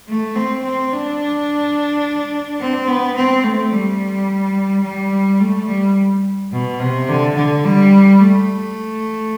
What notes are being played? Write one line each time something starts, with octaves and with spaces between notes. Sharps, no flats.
A3
C4
C4
D4
C4
B3
C4
A3
G3
G3
A3
G3
B2
C3
D3
D3
G3
A3